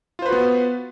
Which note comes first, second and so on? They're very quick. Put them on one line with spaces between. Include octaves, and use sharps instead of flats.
F4 C5 B4 F#4 B3